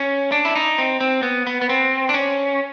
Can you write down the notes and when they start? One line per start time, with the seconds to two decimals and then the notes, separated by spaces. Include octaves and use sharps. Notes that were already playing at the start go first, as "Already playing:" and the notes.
Already playing: C#4
0.32 D4
0.45 E4
0.56 D#4
0.78 C4
1.01 C4
1.23 B3
1.47 B3
1.61 B3
1.69 C4
2.09 D4
2.14 C#4